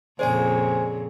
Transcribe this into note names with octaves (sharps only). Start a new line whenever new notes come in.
F2 A#2 C#3 G#4 C5 D5 G#5